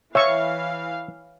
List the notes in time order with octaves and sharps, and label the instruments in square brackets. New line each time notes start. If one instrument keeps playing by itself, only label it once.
[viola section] E3 F5 [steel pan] C#5 C#6 [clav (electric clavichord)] E5